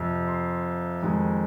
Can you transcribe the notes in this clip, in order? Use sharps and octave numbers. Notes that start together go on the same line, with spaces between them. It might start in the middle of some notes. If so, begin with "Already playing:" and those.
Already playing: F2 C3 F3
C6
F2 D#3 G#3